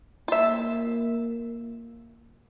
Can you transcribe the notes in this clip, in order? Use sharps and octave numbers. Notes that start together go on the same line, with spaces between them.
A#3 F4 E5